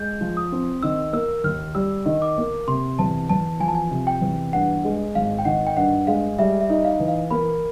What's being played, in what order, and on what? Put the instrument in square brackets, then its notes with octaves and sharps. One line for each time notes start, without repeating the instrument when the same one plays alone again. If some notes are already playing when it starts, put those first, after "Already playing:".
Already playing: [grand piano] G#3 [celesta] G6
[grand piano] F3
[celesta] D#6
[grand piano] C4
[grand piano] D#3 [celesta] E6
[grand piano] A#3 [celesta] E6
[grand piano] D#2 [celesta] F6
[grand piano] G3 [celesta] E6
[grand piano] D#3
[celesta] D6
[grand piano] A#3
[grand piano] C3 [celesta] C6
[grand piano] E2 [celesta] A5
[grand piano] E2 [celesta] A5
[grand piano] F3 [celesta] G#5
[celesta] A5
G#5
[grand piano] C3
[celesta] G5
[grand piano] E2
[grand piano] G2 [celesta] F#5
[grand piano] G#3
[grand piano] G#1 [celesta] F5
[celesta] G5
[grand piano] D#3 [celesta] F#5
[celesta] G5
[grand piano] G2 [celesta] F#5
[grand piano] G#3 [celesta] F5
[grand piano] G3 [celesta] E5
[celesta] E5
[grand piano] D#4
[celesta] F5
[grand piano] E3
[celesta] F5
[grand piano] A#3 [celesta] B5